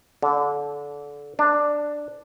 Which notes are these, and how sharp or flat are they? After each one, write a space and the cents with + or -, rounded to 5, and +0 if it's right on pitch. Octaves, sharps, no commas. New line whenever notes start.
D3 -25
D4 +5